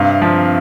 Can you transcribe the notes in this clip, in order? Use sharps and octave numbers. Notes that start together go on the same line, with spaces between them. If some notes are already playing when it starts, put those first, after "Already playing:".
Already playing: G2 C3 F5
F3